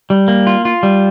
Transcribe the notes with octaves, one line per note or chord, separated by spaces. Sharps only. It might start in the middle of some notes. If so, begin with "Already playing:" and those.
G3
A#3
F4
F4
G3